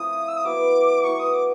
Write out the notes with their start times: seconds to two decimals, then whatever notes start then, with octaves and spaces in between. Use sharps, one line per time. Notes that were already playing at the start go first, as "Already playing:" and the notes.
Already playing: F3 A3 C4 E4 D#6
0.28 E6
0.37 D#6
0.44 F#3 B3 E4 D6
1.03 F#3 B3 E4 C#6
1.19 D#6
1.34 D6